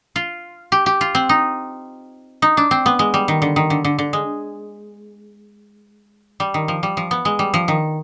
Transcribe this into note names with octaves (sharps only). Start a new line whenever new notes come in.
F4
G4
G4
F4
C4
D#4
D#4
D4
C4
B3
G#3
G3
D#3
D3
D#3
D3
D3
D3
G#3
G3
D#3
F3
G3
F3
B3
G#3
G3
F3
D#3